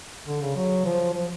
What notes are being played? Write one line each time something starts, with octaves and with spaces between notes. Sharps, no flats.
D3
C#3
F#3
F3
F3